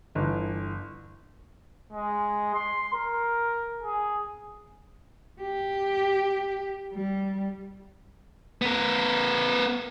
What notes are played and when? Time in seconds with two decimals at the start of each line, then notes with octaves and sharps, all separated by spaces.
0.15 G1 E3
1.92 G#3
2.54 C6
2.93 A#4
3.82 G#4
5.41 G4
6.93 G3
8.62 B3 A#4